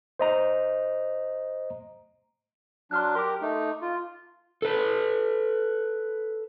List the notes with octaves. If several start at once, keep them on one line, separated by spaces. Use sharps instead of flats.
C5 D#5 A#5
F#3 D4 C6 F6 F#6
G4 A#4 C6 D6
A3 D#4
F4
A4 B4